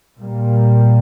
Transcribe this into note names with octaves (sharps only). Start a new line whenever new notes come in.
A#2 G3 A#3